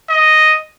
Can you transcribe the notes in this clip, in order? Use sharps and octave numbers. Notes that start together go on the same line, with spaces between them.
D#5